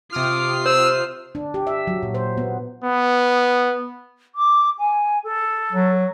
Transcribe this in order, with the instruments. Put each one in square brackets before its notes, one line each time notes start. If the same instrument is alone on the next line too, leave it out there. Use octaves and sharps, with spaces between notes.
[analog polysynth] C3 D#6 F6 [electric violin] F4 C7 [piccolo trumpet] D6
[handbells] C5 [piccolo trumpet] E6
[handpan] D4
G4
E5
F#3
A#2
C5
B3
[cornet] B3
[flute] D6
G#5
A4
[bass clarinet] F#3